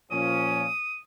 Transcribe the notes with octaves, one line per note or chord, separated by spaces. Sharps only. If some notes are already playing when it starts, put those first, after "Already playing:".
A#2 F3 C#4 D#6